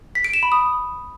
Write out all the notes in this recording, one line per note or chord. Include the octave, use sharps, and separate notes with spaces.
B6
D7
E7
B5
D#6